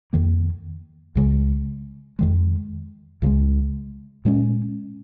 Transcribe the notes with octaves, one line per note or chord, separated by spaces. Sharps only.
F2 D#3 A#3
C#2 C#3 G#3
F2 D#3 G#3
C#2 C#3 F3 G#3
A#2 G#3 C#4